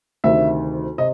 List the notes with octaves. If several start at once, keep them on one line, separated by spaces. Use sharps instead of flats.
D2 C3 D#3 E5
C3 D#5